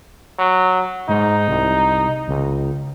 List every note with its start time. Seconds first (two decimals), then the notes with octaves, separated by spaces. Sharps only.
0.39 F#3
1.09 G#2 D#4
1.48 C2
2.28 C#2